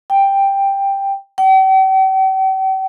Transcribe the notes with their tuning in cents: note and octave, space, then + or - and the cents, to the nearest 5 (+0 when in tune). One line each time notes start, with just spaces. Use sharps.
G5 +5
G5 -45